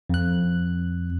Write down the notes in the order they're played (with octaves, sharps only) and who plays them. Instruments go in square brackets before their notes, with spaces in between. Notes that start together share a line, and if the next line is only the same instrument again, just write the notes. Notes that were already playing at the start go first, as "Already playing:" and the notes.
[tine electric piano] F2 F#6